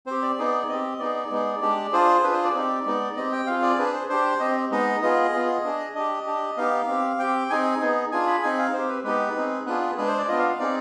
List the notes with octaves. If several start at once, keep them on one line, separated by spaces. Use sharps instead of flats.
C4 G4 C5
D5
B3 D#4 G#4
C4 G4 D#5
B3 D#4 G#4 D5
G#3 B3 D#4 G#4
G#3 D4 G4
D4 F4 G#4 C5
D4 F4 G#4 B4
C5
D5
C4 D#4 G4
G#3 B3 D#4
C4 G4 D#5
G5
C4 F4 G#4 F5
D5
D4 G#4 B4
C5
D4 G4 C5
C4 G4 D#5
G#3 B3 D#4 D#5
B3 F4 G#4 D#5
B3 F4 G#4
D4 G#4
D4 G4 D#5
D4 G4
B3 D#4 G4 F5
C4 G4
C4 G4 G5
C4 D#4 G#4 G#5
B3 D#4 G#4
D4 F4 G#4 G#5
B5
C4 D#4 G#4 G#5
F5
C4 G4 C5
B4
G#3 B3 D#4 G4 B4
C4 D#4 G#4
B3 D4 F4 G#4 B4
G#3 D4 G#4 B4
C5
D5
B3 D4 F4 D#5
F5
F5
C4 D#4 G#4 D5